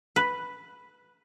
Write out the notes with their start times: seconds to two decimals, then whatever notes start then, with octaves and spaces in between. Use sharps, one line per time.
0.16 B4